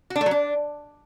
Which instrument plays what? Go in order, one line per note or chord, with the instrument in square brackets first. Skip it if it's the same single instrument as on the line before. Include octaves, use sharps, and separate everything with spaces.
[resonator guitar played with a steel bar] F#4
D4
A3
F#3
D4